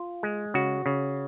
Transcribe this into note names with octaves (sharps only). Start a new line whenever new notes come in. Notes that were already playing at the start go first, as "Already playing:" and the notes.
Already playing: F4
G#3
C#3 F#4
C#3